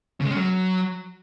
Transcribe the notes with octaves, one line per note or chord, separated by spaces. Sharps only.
C#3
G#3
C#4
F#3